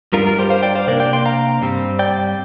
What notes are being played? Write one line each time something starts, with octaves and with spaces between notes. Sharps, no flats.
G2 G3 D4 F4 A#4
F4 A#4
G4 C5
C5 F5
D5 G5
C5 F5
C3 A#3 D4 A#4 D5
D5 G5
G5 C6
F5 A#5
G2 G3 C4
D5 G5